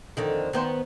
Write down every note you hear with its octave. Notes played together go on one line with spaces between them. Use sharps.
F2 D3 D#3
D#3 B3 C5